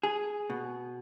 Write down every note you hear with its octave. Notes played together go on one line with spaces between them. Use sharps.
G#4
B2